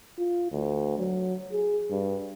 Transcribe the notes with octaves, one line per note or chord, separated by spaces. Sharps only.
F4
D2
F#3
G#4
G2